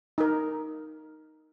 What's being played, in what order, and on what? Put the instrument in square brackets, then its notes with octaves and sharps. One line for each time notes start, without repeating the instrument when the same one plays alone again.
[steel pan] D#4 A#4